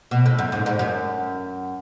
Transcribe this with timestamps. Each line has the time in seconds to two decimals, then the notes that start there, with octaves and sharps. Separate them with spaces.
0.11 B2
0.26 A2
0.38 F#2
0.52 G#2
0.66 G#2
0.79 F#2